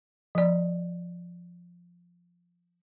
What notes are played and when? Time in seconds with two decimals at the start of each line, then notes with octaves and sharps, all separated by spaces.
0.35 F3 D5